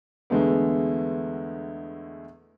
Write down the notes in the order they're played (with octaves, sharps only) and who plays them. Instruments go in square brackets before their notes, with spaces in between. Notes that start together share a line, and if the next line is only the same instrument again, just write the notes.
[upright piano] E2 D3 G#3 A3 B3